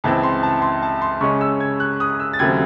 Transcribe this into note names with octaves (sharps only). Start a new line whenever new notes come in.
C#2 C#3 E3 C4 E4 A5
C6
A5
C6
A5
C6
C#3 G#3 C#4 C#6
E6
G#6
F#6
D#6
E6
A6
D#2 C#3 F#3 A3 C4 G#6